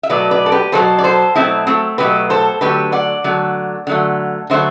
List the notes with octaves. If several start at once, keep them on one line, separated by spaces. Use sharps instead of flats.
E5
B2 F#3 A3 B4 D5
B4 D5
A4
G4 B4
B2 F#3 A3 A4 C5
D5
A4 C5
B2 F#3 A3 C4 E4
A3 C4
B2 F#3 A3 G4 B4
A4 C5
D3 F#3 A3 G4 B4
D5 F#5
D3 F#3 A3
D3 F#3 A3
D3 F#3 A3 C5 E5